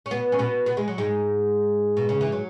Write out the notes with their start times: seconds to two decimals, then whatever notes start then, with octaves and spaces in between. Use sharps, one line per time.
0.06 C#4
0.11 B2 B3
0.32 C#4
0.39 B2 B3
0.66 B3
0.77 G#3
0.88 F#3
0.98 G#2 G#3
1.97 B2
2.09 C#3
2.21 E3
2.32 F#3